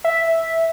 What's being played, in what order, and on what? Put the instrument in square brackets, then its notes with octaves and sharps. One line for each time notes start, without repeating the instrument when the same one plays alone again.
[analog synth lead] E5